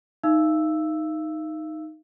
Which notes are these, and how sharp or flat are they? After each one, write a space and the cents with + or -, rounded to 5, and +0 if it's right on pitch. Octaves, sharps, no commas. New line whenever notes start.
D#4 +0 F5 -40 E6 +0